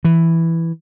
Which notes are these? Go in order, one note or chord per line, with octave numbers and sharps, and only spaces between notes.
E3